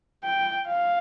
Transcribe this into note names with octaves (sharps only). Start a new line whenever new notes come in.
G5
F5